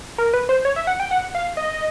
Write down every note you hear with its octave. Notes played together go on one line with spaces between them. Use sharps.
A#4
B4
C5
C#5
E5
F#5
G5
F#5
F5
D#5